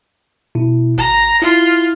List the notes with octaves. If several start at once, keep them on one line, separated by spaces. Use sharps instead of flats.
B2 E4
G#1 A#5
E4 F4